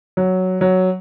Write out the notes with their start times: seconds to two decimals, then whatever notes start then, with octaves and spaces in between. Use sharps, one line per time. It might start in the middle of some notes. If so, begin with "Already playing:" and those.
0.17 F#3
0.61 F#3